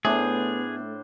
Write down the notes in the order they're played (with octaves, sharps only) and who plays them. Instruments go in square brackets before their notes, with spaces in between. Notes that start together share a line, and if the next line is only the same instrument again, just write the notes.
[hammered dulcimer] A2 D4 C5 [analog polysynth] A3 [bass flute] B3 [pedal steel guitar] G#4